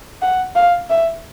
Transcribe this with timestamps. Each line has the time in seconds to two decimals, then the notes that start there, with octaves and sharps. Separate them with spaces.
0.22 F#5
0.55 F5
0.90 E5